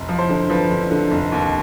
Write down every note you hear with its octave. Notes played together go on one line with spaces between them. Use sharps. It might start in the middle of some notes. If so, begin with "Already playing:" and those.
Already playing: F1
F3
C5
D3
F3 B4
D3
D3
F1
D#2